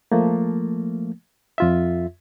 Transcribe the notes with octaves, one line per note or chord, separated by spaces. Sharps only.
F3 A3 A#3
F2 F4 E5